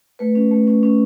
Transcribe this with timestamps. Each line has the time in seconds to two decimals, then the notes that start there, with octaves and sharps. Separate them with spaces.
0.19 A3 B4
0.35 C#4
0.51 A3
0.67 C#4
0.83 C#4